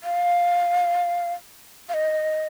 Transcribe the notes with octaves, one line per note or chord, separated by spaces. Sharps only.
F5
F5
D#5